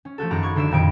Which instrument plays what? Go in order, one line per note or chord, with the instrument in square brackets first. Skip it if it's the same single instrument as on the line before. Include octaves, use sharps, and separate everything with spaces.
[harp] C#4
F3 A3 F#4 A4
G#1 F#2 F#5 A#5 B5 D6
C#6 G#6
D3 D4 D5 E5 C#7 E7
F2 A#2 D#3 G#5 B5 D7